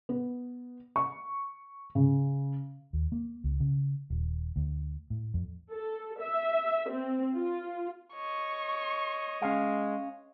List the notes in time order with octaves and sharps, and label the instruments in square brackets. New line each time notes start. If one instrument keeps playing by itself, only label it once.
[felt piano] B3
C#6
C#3
[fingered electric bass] D#2
A#3
C#2
C#3
D#1
D2
A2
F2
[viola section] A4
E5
C4
F4
[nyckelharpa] C#5 D#5 [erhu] C#6
[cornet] G#3 [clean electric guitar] C#4 F5